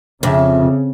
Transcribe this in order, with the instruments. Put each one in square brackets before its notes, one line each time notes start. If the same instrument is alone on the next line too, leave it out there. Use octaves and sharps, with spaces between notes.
[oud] F2 [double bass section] C#3 [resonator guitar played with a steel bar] D4 E5